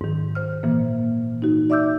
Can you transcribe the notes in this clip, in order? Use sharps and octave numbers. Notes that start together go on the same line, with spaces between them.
G#2 D#3
C5 F6
A#2 E3 A#3
D#4 F#4
D5 E5 D6 E6 G6